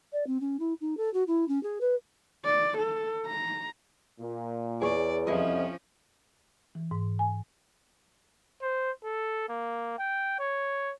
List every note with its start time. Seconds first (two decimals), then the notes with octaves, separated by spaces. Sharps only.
0.13 D5
0.27 C4
0.41 C#4
0.59 E4
0.81 D#4
0.97 A4
1.14 F#4
1.27 E4
1.48 C#4
1.63 G#4
1.81 B4
2.45 D5
2.78 A4
3.26 A#5
4.19 A#2
4.81 E2 G#4 C#5 D5
5.27 C2 F2 F3 C#4 E4 D#5
6.75 E3
6.91 G#2
7.19 G#5
8.62 C5
9.04 A4
9.49 A#3
9.99 G5
10.39 C#5